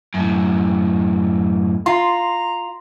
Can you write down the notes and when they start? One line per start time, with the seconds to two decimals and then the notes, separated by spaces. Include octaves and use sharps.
0.14 F#2 A2
1.86 F4 A#5 C6